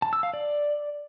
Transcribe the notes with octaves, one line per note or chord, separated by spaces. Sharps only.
A5
E6
F5
D5